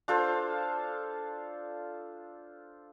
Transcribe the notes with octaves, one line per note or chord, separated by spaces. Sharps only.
D4 F4 A4 C5